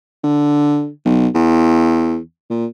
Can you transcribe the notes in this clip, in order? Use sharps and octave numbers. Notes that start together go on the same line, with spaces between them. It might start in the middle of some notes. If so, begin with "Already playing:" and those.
D3
B1
E2
A#2